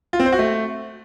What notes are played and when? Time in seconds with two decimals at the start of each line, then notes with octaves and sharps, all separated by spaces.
0.13 F4
0.20 C4
0.26 C5
0.32 F#4
0.39 A3